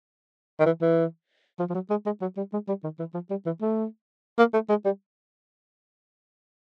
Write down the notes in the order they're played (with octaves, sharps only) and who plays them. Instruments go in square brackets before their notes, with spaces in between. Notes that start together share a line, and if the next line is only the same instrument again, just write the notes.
[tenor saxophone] D#3
E3
E3
F3
F3
F#3
G#3
G#3
F#3
G3
G#3
G3
D#3
E3
F3
G3
E3
A3
A#3
A3
G#3
G3